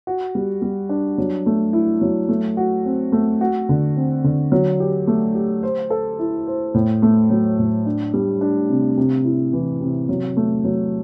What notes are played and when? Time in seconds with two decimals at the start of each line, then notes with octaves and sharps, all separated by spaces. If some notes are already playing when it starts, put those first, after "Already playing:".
0.07 F#4
0.35 G3
0.62 G3
0.89 D4
1.18 F#3
1.46 A3
1.73 E4
2.01 F#3
2.29 A3
2.57 F#4
2.85 C4
3.12 A3
3.41 F#4
3.69 D3
3.97 C4
4.24 D3
4.52 F#3
4.80 G4
5.07 A3
5.35 G4
5.63 C5
5.90 A4
6.19 E4
6.47 C5
6.74 A2
7.02 A3
7.30 F#3
7.59 A2
7.86 D4
8.14 G3
8.41 D4
8.69 C3
8.98 C3
9.24 E4
9.53 E3
9.81 C3
10.09 F#3
10.37 A3
10.65 F#3